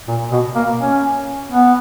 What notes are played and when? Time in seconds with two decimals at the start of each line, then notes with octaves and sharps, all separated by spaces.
0.08 A#2
0.32 B2
0.55 A#3
0.79 C#4
1.51 B3